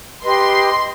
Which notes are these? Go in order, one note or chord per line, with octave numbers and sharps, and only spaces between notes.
G4 B4 D#5 C6 C7